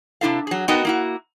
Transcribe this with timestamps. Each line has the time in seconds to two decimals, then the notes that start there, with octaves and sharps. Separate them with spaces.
0.21 C3 D4 E4 A4 F5
0.47 F#3 G#4
0.68 B3 D#4 F#4 A#4 D#5 G5
0.85 A#3 E4 F#4